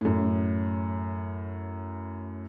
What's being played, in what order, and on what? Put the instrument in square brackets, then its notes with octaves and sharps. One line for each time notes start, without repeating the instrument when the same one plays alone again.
[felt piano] F#2 A2